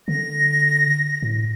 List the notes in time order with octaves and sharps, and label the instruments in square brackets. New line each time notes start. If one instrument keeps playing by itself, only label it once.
[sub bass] D3 [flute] A#6
[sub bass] A2